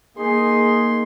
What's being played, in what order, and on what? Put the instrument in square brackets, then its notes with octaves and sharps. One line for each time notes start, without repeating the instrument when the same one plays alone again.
[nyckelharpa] A#3 C6 [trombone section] D#4 G#4